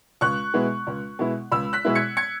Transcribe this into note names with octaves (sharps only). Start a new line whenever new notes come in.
C#2 C#6 F#6
B2 G#3 B3 E4
C#2
B2 G#3 B3 E4
C#2 B5 E6
F#6 B6
B2 G#3 B3 E4
G#6 C#7
G#6 C#7